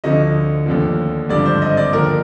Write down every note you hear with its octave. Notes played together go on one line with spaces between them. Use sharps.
D2 D3 F3 D#5
D#2 D3 F3
G#1 G2 D3 F3 D5
C5
D#5
D5
D#2 D3 F3 A#4